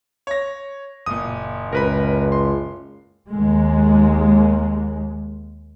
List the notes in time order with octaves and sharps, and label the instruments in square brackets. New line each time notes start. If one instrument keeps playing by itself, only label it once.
[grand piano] C#5 A#6
[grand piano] F#1 A#2 [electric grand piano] D#6
[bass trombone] C#2 [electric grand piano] A#4 B4 B5
[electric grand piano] C6
[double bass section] D#2 G#3